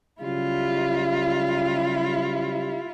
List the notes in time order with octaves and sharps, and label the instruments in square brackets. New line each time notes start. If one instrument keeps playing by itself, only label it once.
[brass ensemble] C#3 F#3 G3 [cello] E4 F4